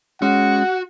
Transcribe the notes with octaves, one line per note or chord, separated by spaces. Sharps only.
G#3 C#4 F#4 F#5